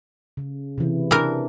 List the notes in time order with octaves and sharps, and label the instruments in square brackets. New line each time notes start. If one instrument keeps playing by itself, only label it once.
[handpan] C#3
C3 E3
[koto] E3 A#4 [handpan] D4